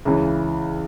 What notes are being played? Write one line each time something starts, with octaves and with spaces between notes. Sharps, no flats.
C#2 C#3 E3